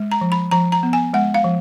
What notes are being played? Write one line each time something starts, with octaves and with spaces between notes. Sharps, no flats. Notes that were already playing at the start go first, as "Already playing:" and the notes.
Already playing: G#3
A#5
F3
B5
F3 A#5
A#5
B3
G#5
G#3 F#5
F5
F3